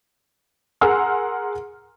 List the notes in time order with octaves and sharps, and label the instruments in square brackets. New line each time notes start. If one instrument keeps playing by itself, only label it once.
[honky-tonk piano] G#4 A#4 F#5 C6 E6 F6